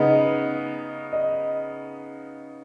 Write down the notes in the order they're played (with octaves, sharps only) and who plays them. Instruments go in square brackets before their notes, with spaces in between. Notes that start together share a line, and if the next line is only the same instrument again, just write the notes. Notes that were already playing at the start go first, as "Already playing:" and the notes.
Already playing: [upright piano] C#3 B3 D#4 [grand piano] D#5
[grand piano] D#5